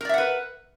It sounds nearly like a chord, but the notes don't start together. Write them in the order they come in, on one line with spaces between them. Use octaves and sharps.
A#4 D5 E5 F#5 B4